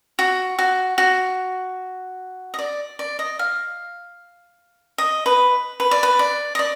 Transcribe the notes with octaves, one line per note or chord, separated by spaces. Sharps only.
F#4
F#4
F#4
D#5
D5
D5
D#5
F5
D#5
B4
B4
D5
B4
D5
D#5
D5